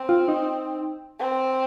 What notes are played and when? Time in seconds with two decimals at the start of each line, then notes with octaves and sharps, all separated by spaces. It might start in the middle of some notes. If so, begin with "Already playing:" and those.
Already playing: C4
0.09 F4
0.28 D#4
1.19 C4